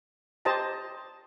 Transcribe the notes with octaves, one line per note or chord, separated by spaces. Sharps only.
G4 C5 D#5 A5 A#5